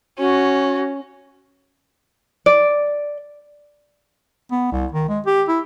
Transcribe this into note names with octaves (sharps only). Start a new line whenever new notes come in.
C#4 F#4
D5
B3
C2
D#3
G#3
G4
E4